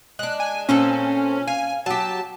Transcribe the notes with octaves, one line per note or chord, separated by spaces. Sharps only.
G#3 D4 F#6
G#5
A#2 C4 C#4 A4
F5 G#5
F#3 G4 A5